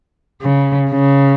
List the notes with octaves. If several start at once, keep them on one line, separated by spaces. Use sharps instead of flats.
C#3
C#3